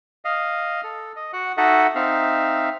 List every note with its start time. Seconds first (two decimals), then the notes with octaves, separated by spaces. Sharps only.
0.25 D#5 F5
0.84 A4
1.16 D#5
1.33 F#4 F#5
1.57 D#4 F#4 A4 D#5 E5 F#5
1.95 C4 D#4 E5 F5